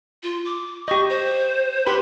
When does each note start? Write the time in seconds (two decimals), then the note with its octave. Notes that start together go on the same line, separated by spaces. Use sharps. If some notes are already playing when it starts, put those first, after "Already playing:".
0.23 F4
0.45 D6
0.88 G4 D#5 C#6
1.10 C5
1.86 G4 B4 B5 C6